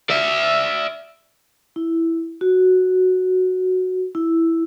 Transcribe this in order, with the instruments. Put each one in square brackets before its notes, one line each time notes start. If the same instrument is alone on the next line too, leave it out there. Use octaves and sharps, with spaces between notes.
[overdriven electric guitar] D5 E5
[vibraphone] E4
F#4
E4